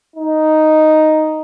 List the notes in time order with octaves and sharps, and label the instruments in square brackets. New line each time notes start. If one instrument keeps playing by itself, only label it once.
[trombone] D#4